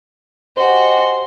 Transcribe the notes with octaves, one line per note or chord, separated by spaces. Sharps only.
F#4 G4 C5 D#5 G#5 C6